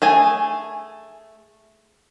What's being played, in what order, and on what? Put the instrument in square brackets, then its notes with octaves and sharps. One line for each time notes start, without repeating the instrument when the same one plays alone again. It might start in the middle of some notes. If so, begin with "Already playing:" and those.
[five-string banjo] A3 G#4 G#5